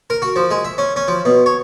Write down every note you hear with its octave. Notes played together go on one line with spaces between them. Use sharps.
A#4
F#4
F3
G#3
E5
C#4
C#4
F3
B2
C#5